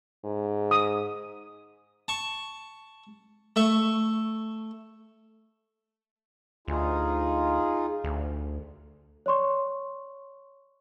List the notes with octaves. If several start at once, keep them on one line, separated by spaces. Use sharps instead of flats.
G#2
D#6
A5 C#6
A3 E5 C#6
D2 D#4 F4 G#4
D2
C#5 D5 C6 C#6